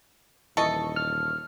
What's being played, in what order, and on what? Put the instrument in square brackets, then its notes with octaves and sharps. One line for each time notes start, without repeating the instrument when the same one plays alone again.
[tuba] D#1 [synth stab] E3 D#5 C#6 [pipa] A4
[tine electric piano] F6